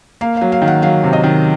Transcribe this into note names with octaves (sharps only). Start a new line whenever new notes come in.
A#3 F5
F#3 F5
F5
D#3
F#5
F#3 F5
C3
D#5
D#3